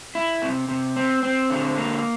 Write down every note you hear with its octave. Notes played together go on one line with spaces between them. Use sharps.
E4
C3
C3
C4
C4
D3
A#3